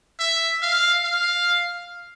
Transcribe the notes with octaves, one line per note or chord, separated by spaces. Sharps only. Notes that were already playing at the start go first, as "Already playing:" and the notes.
E5
F5
F5